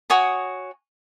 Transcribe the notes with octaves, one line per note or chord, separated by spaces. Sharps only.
F#4 C#5 G#5 D#6